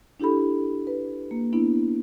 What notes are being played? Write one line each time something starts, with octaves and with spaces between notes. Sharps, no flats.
D4 E4 G4 A4 B5
B4
A#3
B3 D4 E4